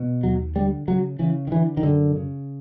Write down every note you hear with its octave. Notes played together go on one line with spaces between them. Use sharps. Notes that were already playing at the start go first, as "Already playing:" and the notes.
Already playing: B2
D#2 F#3
D3 G3
C#3 F#3
C#3 E3
D#3
D3 E3
D#3
F#2 D3
C#3